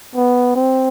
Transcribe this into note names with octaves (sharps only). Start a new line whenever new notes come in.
B3
C4